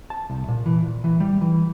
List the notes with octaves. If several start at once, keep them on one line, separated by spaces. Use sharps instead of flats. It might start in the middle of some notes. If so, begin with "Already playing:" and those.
A5
C2
A#2
E3
A#2
E3
G3
E3